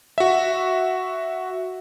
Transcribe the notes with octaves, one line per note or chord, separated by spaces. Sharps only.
F#4 E5